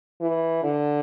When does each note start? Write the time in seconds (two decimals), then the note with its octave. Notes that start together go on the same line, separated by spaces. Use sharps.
0.21 E3
0.63 D3